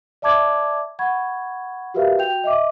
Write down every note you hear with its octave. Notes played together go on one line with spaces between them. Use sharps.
D5 E5 A5 D6 G#6
F#5 B5 C#6 G#6
F#4 G4 A#4 B4 E5 F5
F#4 G5 G6 F7
D#5 E5 D6